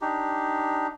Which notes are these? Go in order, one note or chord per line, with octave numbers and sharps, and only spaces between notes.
D4 D#4 G4